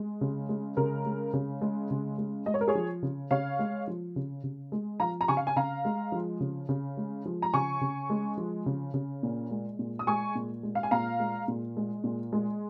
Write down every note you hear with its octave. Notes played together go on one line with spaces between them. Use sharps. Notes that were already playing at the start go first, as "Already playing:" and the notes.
Already playing: G#3
C#3
G#3
C#3 A#4
G#3
C#3
G#3
C#3
G#3
G#3 D#5
C#5
A#4
G#4 C#5
F3
C#3
C#3 C#5 F5
G#3
F3
C#3
C#3
G#3
F3 F5 A#5
A#5
C#3 G#5 C#6
F5
G#5
C#3 F5 A#5
G#3
F3
C#3
C#3
G#3
F3
A#5
C#3 G#5 C#6
C#3
G#3
F3
C#3
C#3
A#2
G#3
A#2
D#6
G#3 G#5 C#6
A#2
G#3
F5
G#5
A#2 F5 A#5
G#3
A#2
G#3
A#2
G#3